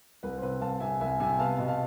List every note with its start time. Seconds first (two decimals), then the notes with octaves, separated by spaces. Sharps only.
0.23 C2 B4
0.38 C5
0.43 C3 B4
0.61 C2 F5 A5
0.80 C3 E5 G#5
1.00 C2 E5 G#5
1.20 C3 E5 G#5
1.39 B3 F5 A5
1.58 B2
1.68 F5 A5